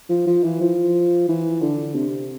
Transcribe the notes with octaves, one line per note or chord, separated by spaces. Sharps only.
F3
F3
E3
F3
E3
D3
C3